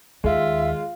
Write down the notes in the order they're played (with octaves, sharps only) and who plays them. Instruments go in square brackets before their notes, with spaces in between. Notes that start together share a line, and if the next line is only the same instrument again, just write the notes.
[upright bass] D#2 [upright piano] G#3 [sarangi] F4 [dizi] E5